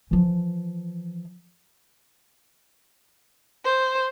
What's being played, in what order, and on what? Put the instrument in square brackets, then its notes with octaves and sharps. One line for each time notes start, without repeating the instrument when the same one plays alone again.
[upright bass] E3 F3
[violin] C5